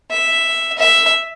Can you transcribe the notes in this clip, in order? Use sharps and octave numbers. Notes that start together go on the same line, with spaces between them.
E5
E5